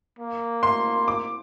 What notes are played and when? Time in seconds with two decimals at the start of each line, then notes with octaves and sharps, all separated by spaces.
0.19 A#3
0.63 C6
1.08 D6